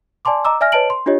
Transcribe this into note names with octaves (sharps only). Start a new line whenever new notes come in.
D5 G#5 A5 C6 D6
D#5 A#5 D6 E6
D5 E5 G#5 F6 A#6
B4 C#5 D#5 A5 D7 F#7
C6
D4 F4 G4 C#5 D#5